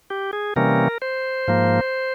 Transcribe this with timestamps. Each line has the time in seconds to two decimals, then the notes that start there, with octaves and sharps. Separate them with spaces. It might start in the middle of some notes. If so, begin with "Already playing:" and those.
0.10 G4
0.33 G#4
0.56 C3 E3 G3 A#3 C#4 A#4
1.02 C5
1.48 G#2 F3 A#3